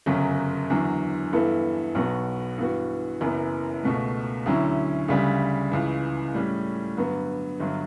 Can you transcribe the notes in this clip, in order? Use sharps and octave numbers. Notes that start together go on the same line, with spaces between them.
G1 F#2 C#3 F#3
E2 D3 F#3
G2 E3 B3 E4 A4
B1 B2 F#3 B3 F#4
G2 E3 B3 F#4
F#1 F#2 E3 B3
C#2 B2 A3
D2 D3 F#3 C#4 E4
D2 C#3 G3
C#2 C#3 E3
A2 G3 C#4
G2 D3 F#3 B3
G1 G2 F#3